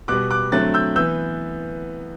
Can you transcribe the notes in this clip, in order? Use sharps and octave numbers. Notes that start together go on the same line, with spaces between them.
B2 G3 B3 D6 F#6
D6 F#6
D3 F#3 A3 C4 F#6 A6
E6 G6
E3 B3 E6 G6